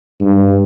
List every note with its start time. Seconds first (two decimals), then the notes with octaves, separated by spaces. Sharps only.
0.21 G2